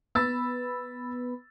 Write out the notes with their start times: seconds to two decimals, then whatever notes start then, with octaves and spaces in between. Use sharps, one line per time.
0.15 B3 B4 B5 E6 A6